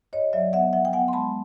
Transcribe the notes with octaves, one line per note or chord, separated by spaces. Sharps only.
G2 C#5 D#5
F#3 D5 E5
B3 E5 F#5
F3 E5 F#5
G5
B3 F#5 G#5
C6
G#3 A5 B5